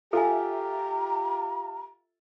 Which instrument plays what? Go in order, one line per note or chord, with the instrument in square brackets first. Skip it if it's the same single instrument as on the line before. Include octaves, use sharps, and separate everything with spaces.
[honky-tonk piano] F4 E5 [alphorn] G4 [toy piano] A4 G#5 [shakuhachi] A#5